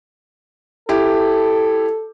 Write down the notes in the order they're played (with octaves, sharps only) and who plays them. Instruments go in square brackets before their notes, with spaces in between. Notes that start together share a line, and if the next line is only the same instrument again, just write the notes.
[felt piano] E4 G4 [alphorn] A4